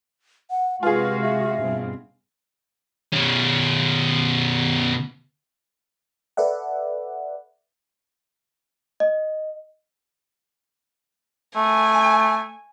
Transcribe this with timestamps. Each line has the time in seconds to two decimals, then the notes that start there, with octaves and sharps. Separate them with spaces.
0.50 F#5
0.83 C3 G#3 F4 F#4 G#4 B4
1.22 E5
1.62 G2 B2 C4
3.13 B2 C#4
6.37 A4 B4 D5 E5 F#5
9.00 D#5
11.56 A3 G#5